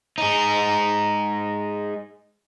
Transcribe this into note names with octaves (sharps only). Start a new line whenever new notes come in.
G#3 D#4